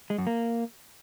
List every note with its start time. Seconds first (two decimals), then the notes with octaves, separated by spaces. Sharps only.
0.10 G#3
0.18 F#2
0.27 A#3